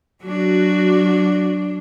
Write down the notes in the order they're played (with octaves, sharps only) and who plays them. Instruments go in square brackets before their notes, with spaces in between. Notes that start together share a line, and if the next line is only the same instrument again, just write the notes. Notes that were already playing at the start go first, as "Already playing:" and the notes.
[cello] F#3 D4 [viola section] F#4